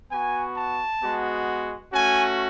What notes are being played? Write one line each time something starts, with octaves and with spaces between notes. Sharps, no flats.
B3 F#4 G#5
A5
G#3 B3 F#4
A3 C#4 F#4 G#5